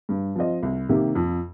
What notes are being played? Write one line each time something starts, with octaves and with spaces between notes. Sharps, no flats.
G2
F3 C4 F4 D#5
C2
C3 D#3 A#3 G4
F2